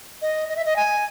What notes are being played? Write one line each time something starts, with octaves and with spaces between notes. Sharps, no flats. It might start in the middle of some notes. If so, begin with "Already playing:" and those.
D#5
D#5
E5
D#5
G#5